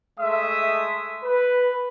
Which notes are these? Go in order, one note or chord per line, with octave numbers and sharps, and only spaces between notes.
G#3 A3 E5 D#6
B4